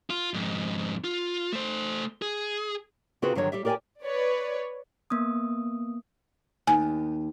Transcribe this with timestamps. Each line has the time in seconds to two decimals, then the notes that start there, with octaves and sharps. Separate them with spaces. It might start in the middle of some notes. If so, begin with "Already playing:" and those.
0.10 F4
0.34 F2 G#2
1.04 F4
1.53 A3 C5
2.22 G#4
3.22 C#3 C4 F4 F#4 G#4 B4
3.35 G2 D3 D#3 F#3 C#5
3.52 G3 G4 E5
3.65 G4 A#4 D5 F5 G5 G#5
4.03 B4 C#5 D5
5.10 A#3 B3 D#6
6.67 D#2 G#5